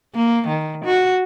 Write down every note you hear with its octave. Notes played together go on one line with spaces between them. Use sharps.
A#3
D#3
F#4